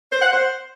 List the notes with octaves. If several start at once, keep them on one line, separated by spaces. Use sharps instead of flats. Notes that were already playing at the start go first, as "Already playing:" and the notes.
C5
F#5
C5